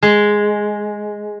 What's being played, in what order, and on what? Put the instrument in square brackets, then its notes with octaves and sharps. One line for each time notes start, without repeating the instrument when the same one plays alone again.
[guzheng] G#3